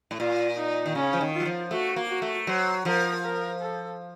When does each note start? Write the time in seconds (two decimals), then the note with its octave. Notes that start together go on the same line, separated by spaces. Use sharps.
0.11 A2
0.19 A#2 F4
0.57 D#4
0.86 D#3
0.95 C#3 C#4
1.13 F3
1.21 D#3
1.34 F4
1.40 F#3
1.46 F3
1.71 A3 F#4
1.96 A#3
2.09 F#4
2.22 A3
2.47 F#3 C5
2.85 F3 A#4
3.23 A#4
3.61 A4